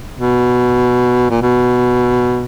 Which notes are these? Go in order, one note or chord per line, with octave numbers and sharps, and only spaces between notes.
B2
A#2
B2